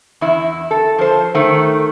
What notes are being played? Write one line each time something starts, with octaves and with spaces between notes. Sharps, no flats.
E2 E4
A4
F3 C5
D#3 A3